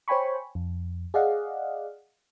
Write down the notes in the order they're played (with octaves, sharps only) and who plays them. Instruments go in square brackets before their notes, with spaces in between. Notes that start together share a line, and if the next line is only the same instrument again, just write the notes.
[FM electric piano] C5 C#5 G5 G#5 B5 C#6
F2
G#4 D5 D#5 F5 F#5